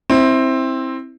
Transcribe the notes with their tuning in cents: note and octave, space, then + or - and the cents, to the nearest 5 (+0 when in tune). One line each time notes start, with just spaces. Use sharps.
C4 +10 E4 -15